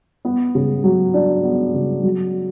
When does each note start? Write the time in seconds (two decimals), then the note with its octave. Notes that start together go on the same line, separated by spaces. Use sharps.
0.25 B3
0.55 C#3
0.84 F#3
1.14 D4
1.44 B3
1.74 C#3
2.03 F#3